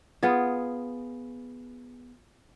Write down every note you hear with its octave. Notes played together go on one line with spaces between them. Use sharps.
B3 F4 G#4